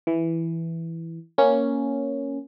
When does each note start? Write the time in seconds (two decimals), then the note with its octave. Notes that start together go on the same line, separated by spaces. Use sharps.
0.07 E3
1.38 A#3 C#4